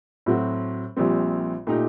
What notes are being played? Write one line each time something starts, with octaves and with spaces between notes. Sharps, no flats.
A2 F#3 C4 F#4
A#1 A#2 G3 C4
A#2 A3 D#4 G4